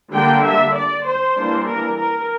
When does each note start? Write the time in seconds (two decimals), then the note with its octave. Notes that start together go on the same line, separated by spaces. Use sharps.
0.13 D3 G3 A#3 D4 G5
0.45 E5
0.75 D5
1.06 C5
1.36 E3 G3 A#3 D4
1.67 A#4
1.98 A#4